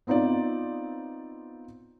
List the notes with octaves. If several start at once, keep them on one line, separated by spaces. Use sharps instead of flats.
B3 C4 D#4 F4 D5